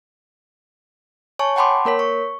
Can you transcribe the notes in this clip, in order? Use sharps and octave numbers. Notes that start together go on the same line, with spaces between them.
C#5 G#5 A5 C#6
F#5 G5 A5 B5 C6 D6
A#3 A#4 C#5 B6
C#6